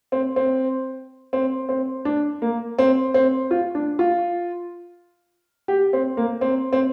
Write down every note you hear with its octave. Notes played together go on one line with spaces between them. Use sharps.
C4
C4
C4
C4
D4
A#3
C4
C4
F4
D4
F4
G4
C4
A#3
C4
C4